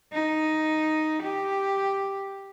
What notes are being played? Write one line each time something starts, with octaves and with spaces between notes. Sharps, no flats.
D#4
G4